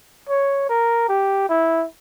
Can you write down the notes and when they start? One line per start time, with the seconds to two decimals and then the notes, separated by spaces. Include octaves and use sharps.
0.29 C#5
0.69 A#4
1.09 G4
1.49 E4